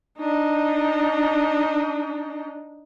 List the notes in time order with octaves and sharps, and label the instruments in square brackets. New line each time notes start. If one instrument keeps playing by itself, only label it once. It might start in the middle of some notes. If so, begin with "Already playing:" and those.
[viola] D4 D#4